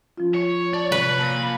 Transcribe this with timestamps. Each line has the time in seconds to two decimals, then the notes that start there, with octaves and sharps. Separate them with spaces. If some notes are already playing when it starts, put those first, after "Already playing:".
0.17 F3 C#4 F4
0.34 C#5
0.74 D5 A5
0.92 C3 B4 B5
1.19 A#2 A5